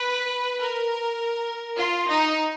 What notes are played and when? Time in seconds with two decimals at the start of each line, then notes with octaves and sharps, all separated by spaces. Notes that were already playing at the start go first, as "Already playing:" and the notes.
Already playing: B4
0.59 A#4
1.77 F4
2.07 D#4